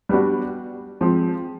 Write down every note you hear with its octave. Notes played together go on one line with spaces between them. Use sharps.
G3 B3 D4 F#4
F3 G#3 C4